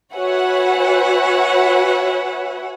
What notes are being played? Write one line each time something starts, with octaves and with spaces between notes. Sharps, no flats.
F#4 B4 C#5 E5 F#5 G#5